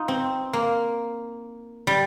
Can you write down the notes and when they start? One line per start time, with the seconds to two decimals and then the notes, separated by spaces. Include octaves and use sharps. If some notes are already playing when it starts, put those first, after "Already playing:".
Already playing: D#4 F4
0.08 C4
0.53 A#3
1.87 G3